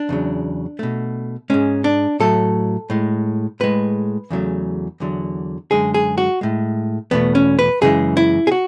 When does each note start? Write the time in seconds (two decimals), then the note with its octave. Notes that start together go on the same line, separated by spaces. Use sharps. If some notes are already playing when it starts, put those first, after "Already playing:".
Already playing: D4
0.09 E2 C#3 F#3
0.79 B2 A3
1.50 G#2 G#3 C#4
1.84 D4
2.20 A2 F#3 A3 A4
2.90 A2 G#3
3.60 A2 G#3 B4
4.30 E2 C#3 F#3 A3
5.00 E2 D3 F#3
5.71 F#2 D3 G#3 G#4
5.94 G#4
6.18 F#4
6.41 A2 G#3
7.11 E2 B2 A3 B3
7.35 C#4
7.59 B4
7.81 F#2 C#3 E3 G#3 G#4
8.17 E4
8.47 G#4
8.52 F#4